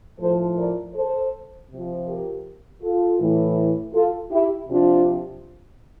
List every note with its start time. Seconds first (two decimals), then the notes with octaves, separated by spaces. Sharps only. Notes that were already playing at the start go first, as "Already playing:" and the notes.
0.19 A2 F3 A4 C5
0.57 A#4 D5
0.95 A4 C5
1.70 C3 F3
2.07 G4 A#4
2.81 F4 A4
3.19 A2 E3
3.94 F4 A4
4.31 E4 G4
4.69 C3 F3 D4 F4